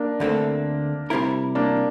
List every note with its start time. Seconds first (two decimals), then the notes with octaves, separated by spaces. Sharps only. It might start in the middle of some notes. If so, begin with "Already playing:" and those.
Already playing: A#3 D4
0.20 D2 D3 A3 C4
1.10 C3 G3 C4 E4 A#4
1.55 A#3 D4